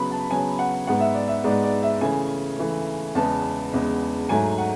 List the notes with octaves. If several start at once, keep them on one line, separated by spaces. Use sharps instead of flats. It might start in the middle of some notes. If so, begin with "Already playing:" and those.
Already playing: C#3 F#3 B3 B5
A5
C#3 F#3 B3 G#5
F#5
G#2 G#3 B3 F#5
E5
D5
E5
G#2 G#3 B3 D5
D5
E5
C#3 E3 A3 G#5
C#3 E3 A3
E2 C#3 G#3 B3 A5
E2 C#3 G#3 B3
G#2 F#3 A3 G#5
F#5